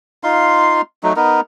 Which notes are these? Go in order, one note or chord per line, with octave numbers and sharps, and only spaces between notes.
D#4 F4 F5 C6
F#3 A3 D#4
B3 D#4 A#4